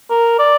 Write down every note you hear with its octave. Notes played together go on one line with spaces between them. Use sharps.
A#4
D5